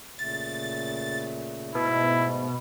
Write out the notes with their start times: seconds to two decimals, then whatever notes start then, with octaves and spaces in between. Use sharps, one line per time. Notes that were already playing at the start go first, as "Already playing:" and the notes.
0.19 A#2 C#3 A3 A6
1.75 G#2 B2 A3 E4